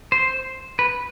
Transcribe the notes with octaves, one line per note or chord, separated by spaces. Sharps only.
C5
B4